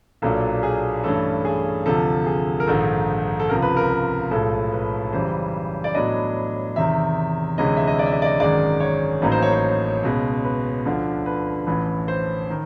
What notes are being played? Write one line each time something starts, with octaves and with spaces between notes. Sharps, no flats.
B1 A#2 F#3 A#3 D4 A4
G#4
G2 E3 A3 C#4 A4
G#4
D2 C3 F3 A4
G#4
A#4
A#1 G#2 D#3 A4
A4
C#2 C3 F3 A#4
B4
A#4
B4
B1 A2 F3 G#3 A4
B4
F#2 C#3 E3 G3 C5
D5
A2 F#3 B3 D4 D#5
E2 C3 D#3 E5
D2 C3 E3 G#3 C#4 D#5
E5
D#5
D5
E5
D#5
D5
D#5
G#1 F#2 D#3 G#3 D5
C#5
A1 A2 F#3 A#3 D#4 B4
C5
C#5
C5
C#2 B2 G#3
B4
D2 D3 F3
B4
A1 A2 E3 B4
C5
D#3